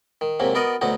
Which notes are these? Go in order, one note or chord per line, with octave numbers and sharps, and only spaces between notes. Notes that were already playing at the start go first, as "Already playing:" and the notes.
D#3
G#2 C3 F#3 A#3
B3 F#4 A#4 D5 D#5
D2 B2 F#3 D#4 F#4